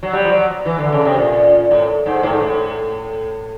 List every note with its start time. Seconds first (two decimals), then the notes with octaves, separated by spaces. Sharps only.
0.03 F#3
0.13 G3
0.25 F3
0.30 F#3
0.65 E3
0.78 D3
0.92 C#3
1.05 C3
1.18 A#2
1.71 A2
2.06 G#2
2.23 A2
2.32 G#2
2.41 A2